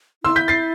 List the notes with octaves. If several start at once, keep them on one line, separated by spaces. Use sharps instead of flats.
E4 C6 E6
G6 B6
A6 C7